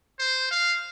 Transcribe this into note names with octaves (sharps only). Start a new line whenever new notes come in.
C5
F5